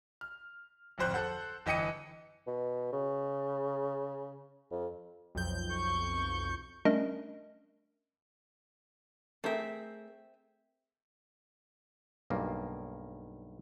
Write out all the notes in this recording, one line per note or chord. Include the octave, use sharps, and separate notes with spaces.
F6
D1 G#1 F2 C5 F#6
A4 C5 F#5
G1 E3 D#5 G5 C#7 D#7
B2
C#3
F2
B1 F2 G6
C#6
G3 A3 C#4 D4 A#4 D#5
A3 C4 G#4 A#4 E5
B1 G2 A#3